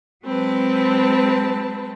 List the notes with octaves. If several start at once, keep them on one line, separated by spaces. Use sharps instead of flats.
F#3 G#3 C4 B4 A5